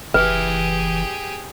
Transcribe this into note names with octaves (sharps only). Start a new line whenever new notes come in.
F#1 E3 G4 G#4 B4 E5